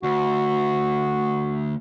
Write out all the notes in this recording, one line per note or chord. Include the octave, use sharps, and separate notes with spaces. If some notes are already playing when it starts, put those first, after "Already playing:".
D2 F#4